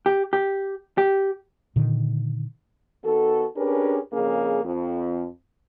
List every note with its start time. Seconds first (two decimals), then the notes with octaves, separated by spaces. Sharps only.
0.06 G4
0.33 G4
0.98 G4
1.76 A#2 D3 D#3
3.03 D#3 B3 F#4 A4
3.57 C#4 D4 G4 G#4 A#4 B4
4.13 F2 C#3 A#3 C#4 G#4
4.64 F2